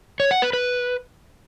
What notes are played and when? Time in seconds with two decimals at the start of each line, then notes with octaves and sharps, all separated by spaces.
0.20 C#5
0.31 F#5
0.42 B4
0.53 B4